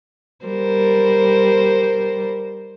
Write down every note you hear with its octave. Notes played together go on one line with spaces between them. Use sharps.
G3 A#4 C5